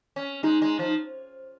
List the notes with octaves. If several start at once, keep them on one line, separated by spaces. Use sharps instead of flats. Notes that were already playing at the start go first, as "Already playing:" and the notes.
C#4
G#3 D#4
G#3
F3